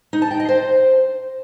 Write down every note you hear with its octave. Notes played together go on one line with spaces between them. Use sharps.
D#4
A5
G5
D#5
C5